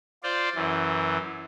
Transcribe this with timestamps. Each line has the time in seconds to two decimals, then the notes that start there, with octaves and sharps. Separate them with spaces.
0.23 F4 C5 D5
0.55 F#2 E3